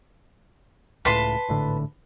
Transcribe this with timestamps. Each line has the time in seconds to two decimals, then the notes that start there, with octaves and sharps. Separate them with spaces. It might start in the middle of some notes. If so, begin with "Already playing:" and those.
1.05 C#2 A2 B4 A5 C6
1.48 G#1 A2 D3